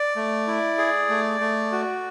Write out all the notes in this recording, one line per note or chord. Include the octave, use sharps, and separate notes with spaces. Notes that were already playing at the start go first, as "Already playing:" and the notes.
Already playing: D5
A3
E4
G#4
A3
A3
F#4